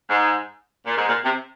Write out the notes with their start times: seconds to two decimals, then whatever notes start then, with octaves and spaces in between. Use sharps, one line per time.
0.09 G#2
0.86 A#2
0.96 G#2
1.08 A#2
1.24 C3